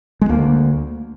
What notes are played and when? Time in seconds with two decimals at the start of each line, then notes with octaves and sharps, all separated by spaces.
0.21 G#3
0.29 D2 A#3